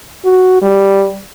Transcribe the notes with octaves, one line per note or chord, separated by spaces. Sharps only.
F#4
G3